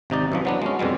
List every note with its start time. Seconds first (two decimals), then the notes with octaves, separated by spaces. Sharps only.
0.10 G#1 C3 D#4 D5
0.32 F#2 E3 F3
0.45 F#3 B3 D4
0.62 G#3 C#4
0.79 F2 B2 G3 G#3